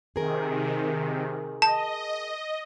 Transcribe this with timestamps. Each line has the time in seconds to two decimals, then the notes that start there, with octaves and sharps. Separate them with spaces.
0.16 C3 D#3 G#4 A#4
1.62 D#5 A5